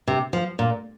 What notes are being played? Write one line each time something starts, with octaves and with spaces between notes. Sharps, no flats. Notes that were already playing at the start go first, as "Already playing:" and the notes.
C3
F3
A#2